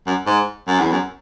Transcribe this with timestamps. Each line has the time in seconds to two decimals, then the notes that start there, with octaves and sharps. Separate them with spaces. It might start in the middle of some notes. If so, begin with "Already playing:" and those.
0.07 F#2
0.26 G#2
0.67 F#2
0.80 E2
0.92 F#2